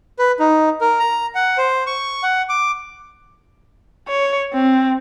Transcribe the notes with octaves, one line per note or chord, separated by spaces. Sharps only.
B4
D#4
A#4
A#5
F#5
C5
C#6
F#5
D6
C#5
C4